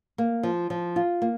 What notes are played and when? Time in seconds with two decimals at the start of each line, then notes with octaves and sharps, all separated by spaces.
0.18 A#3
0.43 F3
0.70 F3
0.96 F4
1.22 A#3